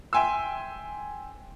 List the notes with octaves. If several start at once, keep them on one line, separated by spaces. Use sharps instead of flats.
E5 G5 G#5 C6 E6